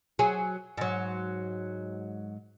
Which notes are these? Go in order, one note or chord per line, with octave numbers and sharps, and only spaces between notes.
F#3 G#4
G#2 F#3